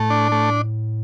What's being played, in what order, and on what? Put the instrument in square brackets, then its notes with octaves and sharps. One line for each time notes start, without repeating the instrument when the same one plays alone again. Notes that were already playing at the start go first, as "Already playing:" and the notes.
Already playing: [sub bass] A2 [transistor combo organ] A3
[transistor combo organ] D4
A3